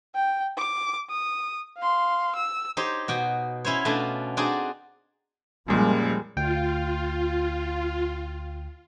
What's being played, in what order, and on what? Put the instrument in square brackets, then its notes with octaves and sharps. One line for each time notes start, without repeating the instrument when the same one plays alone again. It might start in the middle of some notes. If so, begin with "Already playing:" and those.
[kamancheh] G5
D6
D#6
F5 C6
E6
[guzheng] D#4 G4 C5 C#5
B2 F#4 G5
C#4 E4 C5 C#5
B2 A3 C#4 D4 F4 F#4
C4 D4 D#4 F#4 G#4 D5
[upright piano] F#2 A#2 [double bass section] F3 G3 G#3
[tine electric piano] D2 G5 [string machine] F4